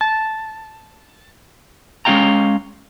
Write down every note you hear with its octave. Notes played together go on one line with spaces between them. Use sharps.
A5
G#3 C#4 D#4 F5 G5 A#5